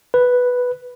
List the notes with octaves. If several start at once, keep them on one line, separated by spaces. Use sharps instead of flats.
B4